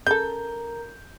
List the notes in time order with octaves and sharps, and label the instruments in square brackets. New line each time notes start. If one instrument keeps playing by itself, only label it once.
[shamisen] C#3 A4 [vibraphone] A#4 A#5 [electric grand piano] G6